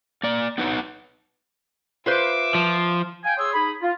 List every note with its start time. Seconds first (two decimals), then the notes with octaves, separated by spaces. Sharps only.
0.23 A#3 D5
0.58 B3 D#4 B4 F#5
2.06 F4 B4 C5 E5 D6
2.55 F3
3.24 F5 G5 G#5
3.38 G#4 C#5 C6 D#6 E6
3.54 D#4 G#4 B5
3.82 F4